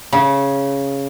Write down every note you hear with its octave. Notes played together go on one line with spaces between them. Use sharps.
C#3